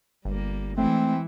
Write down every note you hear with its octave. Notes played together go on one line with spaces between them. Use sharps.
G1 G3 A#3
E3 G#3 A3 C4 E4